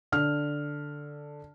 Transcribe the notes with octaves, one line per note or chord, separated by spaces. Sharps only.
D3 F6